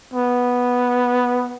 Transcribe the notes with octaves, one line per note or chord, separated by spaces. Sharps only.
B3